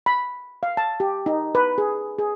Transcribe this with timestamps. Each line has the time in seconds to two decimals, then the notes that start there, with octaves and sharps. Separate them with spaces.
0.06 B5
0.63 F5
0.77 A5
1.00 G4
1.26 D#4
1.55 B4
1.78 G#4
2.19 G#4